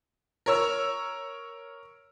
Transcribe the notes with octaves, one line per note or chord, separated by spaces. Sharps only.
A#4 C#5 E6